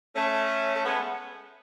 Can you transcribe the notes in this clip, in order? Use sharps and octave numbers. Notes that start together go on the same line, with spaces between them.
A3 C#4
A3
G#3 B3